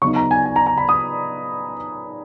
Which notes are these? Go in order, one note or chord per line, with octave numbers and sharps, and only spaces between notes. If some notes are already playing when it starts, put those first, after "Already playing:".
C#3 F#3 B3 D#4 C#6
A#5
G#5
G#5
A#5
A#5
B5
D#6